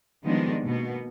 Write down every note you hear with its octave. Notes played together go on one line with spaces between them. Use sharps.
D#3 F3 G3 G#3 B3 D4
B2 A#3 B3